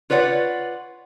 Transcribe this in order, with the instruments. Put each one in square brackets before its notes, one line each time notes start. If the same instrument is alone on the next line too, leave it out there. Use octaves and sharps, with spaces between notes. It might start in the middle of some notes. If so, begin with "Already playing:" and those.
[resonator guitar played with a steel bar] F4 B4 C#5 D5 F#5